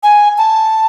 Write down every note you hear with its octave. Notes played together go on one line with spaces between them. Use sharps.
G#5
A5